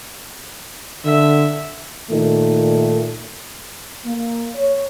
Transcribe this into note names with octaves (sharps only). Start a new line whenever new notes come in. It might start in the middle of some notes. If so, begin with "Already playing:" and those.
D3 E5
A#2 D#3 A3
A#3
C#5